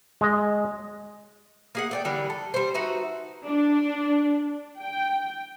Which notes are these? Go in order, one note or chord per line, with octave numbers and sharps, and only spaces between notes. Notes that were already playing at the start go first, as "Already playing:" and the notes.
G#3 D#5
A#3 G#4 F#5
A3 D5 G5
D3 E3 G3 A#4
A4
G3 C5
D#4 F#4 B4 E5
D4
G5